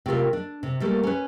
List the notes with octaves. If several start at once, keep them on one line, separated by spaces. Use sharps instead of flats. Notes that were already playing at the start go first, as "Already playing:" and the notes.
C3 A3 F4 A#4
D4
C3
G3 A3 A#3
C#4 B4